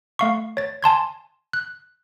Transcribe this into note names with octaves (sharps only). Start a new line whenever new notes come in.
A3 F5 C#6
C#5 A6
G#5 A5 C6 G#6
F#6